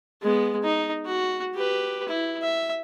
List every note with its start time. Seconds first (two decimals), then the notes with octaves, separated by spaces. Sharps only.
0.22 G#3 B3
0.63 D#4
1.05 F#4
1.55 G4 B4
2.08 E4
2.42 E5